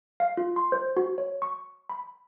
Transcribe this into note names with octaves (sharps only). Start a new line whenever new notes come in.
F5
F4
C6
C5
F#4
C#5
C#6
B5